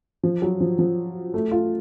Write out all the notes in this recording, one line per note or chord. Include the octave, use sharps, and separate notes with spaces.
F3
F#3
F3
F3
A3
F4